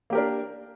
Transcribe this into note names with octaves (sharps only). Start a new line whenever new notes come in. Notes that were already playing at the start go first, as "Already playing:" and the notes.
A#3 D4 G4 A#4